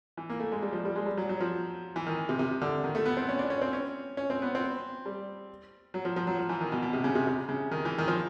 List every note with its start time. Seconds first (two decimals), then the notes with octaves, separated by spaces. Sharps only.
0.17 E3
0.29 A#3
0.40 A3
0.52 G#3
0.62 G3
0.73 F3
0.85 G3
0.96 G#3
1.06 G3
1.17 F#3
1.29 F#3
1.40 F3
1.96 E3
2.06 D#3
2.29 C3
2.39 C3
2.62 D3
2.84 D#3
2.95 A3
3.05 B3
3.17 C4
3.29 C#4
3.39 D4
3.50 C#4
3.62 C4
3.73 C#4
4.17 C#4
4.30 C4
4.42 B3
4.55 C4
5.06 G3
5.94 F#3
6.05 F3
6.16 F3
6.27 F#3
6.39 F3
6.49 E3
6.61 D#3
6.72 B2
6.82 B2
6.93 C3
7.04 C#3
7.15 C3
7.27 C3
7.49 C#3
7.71 D#3
7.85 E3
7.98 D#3
8.08 F3